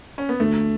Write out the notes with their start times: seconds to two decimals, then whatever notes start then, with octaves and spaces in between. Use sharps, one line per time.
0.18 C#4
0.29 B3
0.40 D2 A3